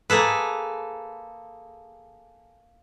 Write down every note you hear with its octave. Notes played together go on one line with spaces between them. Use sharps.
A#3 G#4 A4 B4